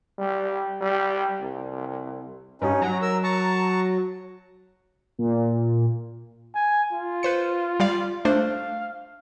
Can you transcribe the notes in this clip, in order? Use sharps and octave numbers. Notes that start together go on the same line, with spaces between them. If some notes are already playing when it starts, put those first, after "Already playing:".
G3
G3
C2
G2 C#4 D#4
F#3 A#5
A#4 E6
A5 A#5 C#6
A#2
G#5
F4
B4 C5 C#7
G3 D5 F5
A3 D4 C5 F5